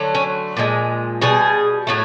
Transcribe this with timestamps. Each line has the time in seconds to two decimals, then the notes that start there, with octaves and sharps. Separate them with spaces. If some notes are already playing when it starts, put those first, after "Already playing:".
Already playing: D3 F#3 A3
0.15 C#4
0.57 A#2 F3 G#3
1.21 B2 G3 G#4
1.87 A2 F#3 A3